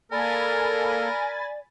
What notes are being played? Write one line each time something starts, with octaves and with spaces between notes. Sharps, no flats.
A#3 A4 A#4 D5 G#5 B5 A6